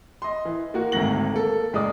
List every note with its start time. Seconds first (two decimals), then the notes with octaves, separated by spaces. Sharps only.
0.22 D#5 C6
0.45 E3
0.74 A#3 F#4
0.92 G#1 D2 G#2 A#6 F#7
1.33 A#3 A4
1.73 F#1 G#3 D5 D#6